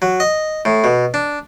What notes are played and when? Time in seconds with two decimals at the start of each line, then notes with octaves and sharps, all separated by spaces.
0.02 F#3
0.20 D#5
0.65 A2
0.84 B2
1.14 D4